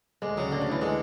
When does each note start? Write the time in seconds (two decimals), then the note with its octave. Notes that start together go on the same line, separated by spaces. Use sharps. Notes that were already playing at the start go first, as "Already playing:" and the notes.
0.22 D2 G#3
0.37 C#3 F#3
0.51 D2 D3
0.61 D3
0.67 D2 E3
0.81 D3 G#3